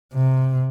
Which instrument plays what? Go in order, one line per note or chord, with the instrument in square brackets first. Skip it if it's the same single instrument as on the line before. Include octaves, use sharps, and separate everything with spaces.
[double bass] C3